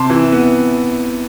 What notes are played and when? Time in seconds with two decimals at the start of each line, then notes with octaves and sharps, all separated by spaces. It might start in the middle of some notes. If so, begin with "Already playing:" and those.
Already playing: C3 A5 C6
0.10 E3
0.32 B3